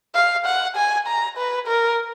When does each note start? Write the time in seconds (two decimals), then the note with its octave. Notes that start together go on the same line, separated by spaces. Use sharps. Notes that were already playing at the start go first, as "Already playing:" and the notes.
0.15 F5
0.46 F#5
0.76 G#5
1.07 A#5
1.37 B4
1.68 A#4